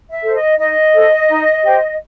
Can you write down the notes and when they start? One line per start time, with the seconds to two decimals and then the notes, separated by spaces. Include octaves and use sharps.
0.11 E5
0.22 A4 C5
0.35 D#5
0.58 D#4 D#5
0.94 A4 C5
1.29 D#4
1.63 G4 C5